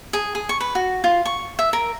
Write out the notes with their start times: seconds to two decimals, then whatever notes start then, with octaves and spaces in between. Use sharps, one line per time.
0.13 G#4
0.35 G#4
0.49 C#6
0.60 B4
0.75 F#4
1.04 F4
1.25 C#6
1.59 E5
1.73 A#4